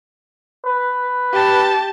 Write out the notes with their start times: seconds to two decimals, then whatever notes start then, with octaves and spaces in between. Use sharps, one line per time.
0.65 B4
1.33 G4 A5